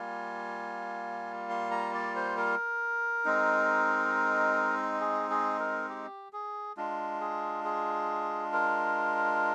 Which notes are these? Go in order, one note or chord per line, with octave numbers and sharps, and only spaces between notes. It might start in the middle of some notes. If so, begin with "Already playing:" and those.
Already playing: G3 A#3 F4 G#5
C6
A#5
D5
C5
A#4
G#3 C4 D#4
G#4
G#4
A#4
G4
G#4
G#3 D4 F4
G#4
G#4
A#4